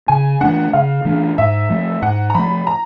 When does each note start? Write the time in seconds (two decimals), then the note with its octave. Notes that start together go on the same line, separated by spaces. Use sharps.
0.08 C#3 G#5
0.41 E3 A3 D4 F#5
0.73 C#3 F5
1.05 E3 A3 D4
1.38 G#2 E5
1.70 F3 A3
2.02 G#2 F#5
2.30 A#5
2.35 F3 A3 B5
2.67 A#5